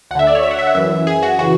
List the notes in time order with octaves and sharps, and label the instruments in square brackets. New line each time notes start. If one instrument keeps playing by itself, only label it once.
[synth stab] D2 F#5
D3 E5
D5
C#5
E5
F#5
E5
F#5
F#2 E3 E5
G#4
F#4
C#3 E3 F#4